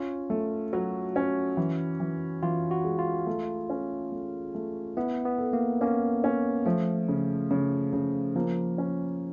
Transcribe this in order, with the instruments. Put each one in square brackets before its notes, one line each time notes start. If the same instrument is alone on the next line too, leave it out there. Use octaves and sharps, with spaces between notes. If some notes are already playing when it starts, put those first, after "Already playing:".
Already playing: [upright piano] C#4 [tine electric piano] F4
[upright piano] A3
[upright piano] F#3 [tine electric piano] F#4
[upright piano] C#4
E3
E3
[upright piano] E3 [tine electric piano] F4
[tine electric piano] F#4
[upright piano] G#3
[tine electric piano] F4
[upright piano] A3
C#4
A3
A3
[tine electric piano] B3 [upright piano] E4
[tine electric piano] B3
[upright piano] A4
[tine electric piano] A#3
[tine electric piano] A#3 [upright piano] C#4
[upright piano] C#4
[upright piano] F3 [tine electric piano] A3
[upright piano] C#3
C#3
C#3
[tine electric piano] F3 [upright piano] A#3
[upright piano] C#4